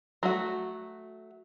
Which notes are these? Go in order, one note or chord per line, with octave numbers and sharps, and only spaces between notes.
F#3 A3 F#4